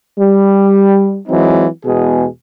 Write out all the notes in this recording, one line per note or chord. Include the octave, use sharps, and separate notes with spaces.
G3
E3 F#3 G#3 C4 D#4
E2 B2 G#3 G#4